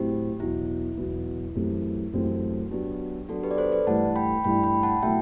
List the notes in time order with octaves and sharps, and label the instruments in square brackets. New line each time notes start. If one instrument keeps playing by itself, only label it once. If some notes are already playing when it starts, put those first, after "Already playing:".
Already playing: [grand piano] A2 F#3 C4 E4 [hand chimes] G4
[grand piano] E2 B2 F#3 [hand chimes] E4
[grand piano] E2 B2 F#3
F#2 E3 A3 C4 G4
[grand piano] F#2 E3 A3 C4 G4 [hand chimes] F#4
[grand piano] F#3 B3 D4 [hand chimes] G4
[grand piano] F#3 B3 D4 [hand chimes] F#4 A4
[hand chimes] G4 B4
D5
A4 C5
B4 D5
[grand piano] G2 E3 A3 E4 G4 [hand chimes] F#5 A5
[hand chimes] G5 B5
[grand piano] G2 E3 A3 E4 G4 [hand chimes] G5 B5
[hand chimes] G5 B5
F#5 A5
[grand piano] B2 F#3 A3 E4 [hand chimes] E5 G5